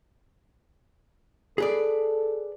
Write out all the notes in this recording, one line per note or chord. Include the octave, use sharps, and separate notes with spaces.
G#4 A4 B4 D5